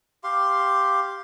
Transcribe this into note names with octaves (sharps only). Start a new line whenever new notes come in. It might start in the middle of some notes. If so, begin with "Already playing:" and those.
G4 F5 C6